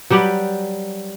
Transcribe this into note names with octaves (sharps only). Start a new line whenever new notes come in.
F#3 G3 G4 B4